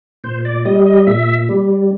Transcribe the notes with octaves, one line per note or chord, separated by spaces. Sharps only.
A#2 C5
D5
G3 D#5
D#5
A#2 E5
G3